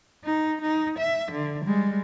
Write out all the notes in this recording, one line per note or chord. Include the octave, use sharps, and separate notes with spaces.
D#4
D#4
E5
D3
G3 G#3